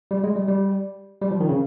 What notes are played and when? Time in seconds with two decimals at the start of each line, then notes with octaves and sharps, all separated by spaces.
0.11 G3
0.24 G#3
0.36 G3
0.48 G3
1.21 G3
1.31 F3
1.40 D#3
1.49 C#3